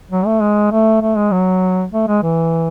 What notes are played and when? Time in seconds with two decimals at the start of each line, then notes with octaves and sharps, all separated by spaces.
0.11 F#3
0.26 A3
0.41 G#3
0.72 A3
1.01 A3
1.17 G#3
1.31 F#3
1.92 A3
2.07 G#3
2.23 E3